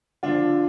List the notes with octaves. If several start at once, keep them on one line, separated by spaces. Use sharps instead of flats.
D3 F3 D4 F4